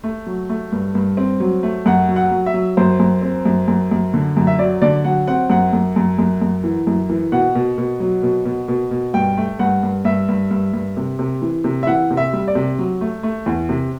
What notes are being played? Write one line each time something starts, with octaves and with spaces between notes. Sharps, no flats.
A3
F#3
A3
G2
G2
C4
F#3
A3
F#2 F#5
F#3
F#5
F#3
E5
F#3
F#2 C5
F#2
C4
F#2
F#2
F#2
D3
F#2
E5
F#3 D5
D3 D5
F#3 F#5
C4 F#5
F#2 F#5
F#2
F#2
F#2
F#2
E3
F#2
E3
B2 F#5
B2
B2
F#3
B2
B2
B2
B2
G2 G5
A3
G2 F#5
G2
G2 E5
G2
G2
G2
C3
C3
E3
C3
E5
E3 F#5
C3
E5
G3
D5
C3
F#3
A3
A3
E2
C3